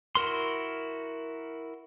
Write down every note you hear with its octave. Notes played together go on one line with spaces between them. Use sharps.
E4 F#4 A#4 C6